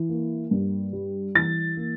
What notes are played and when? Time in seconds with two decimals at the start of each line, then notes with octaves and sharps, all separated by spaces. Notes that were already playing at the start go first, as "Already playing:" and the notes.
Already playing: E3
0.09 A#3
0.51 G2
0.93 G3
1.35 E3 A6
1.77 A#3